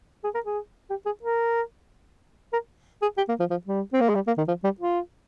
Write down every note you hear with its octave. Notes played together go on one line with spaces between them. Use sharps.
G#4
A#4
G#4
G4
G#4
A#4
A#4
G#4
G4
A#3
F3
F3
G3
C4
A#3
G#3
G3
A#3
D#3
F3
G3
F4